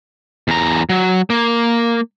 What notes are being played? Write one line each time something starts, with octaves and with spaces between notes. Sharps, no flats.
E2 A#5
F#3
A#3